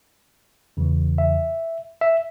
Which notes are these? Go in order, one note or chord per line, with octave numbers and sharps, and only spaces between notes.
E2 C#3 E3
E5
E5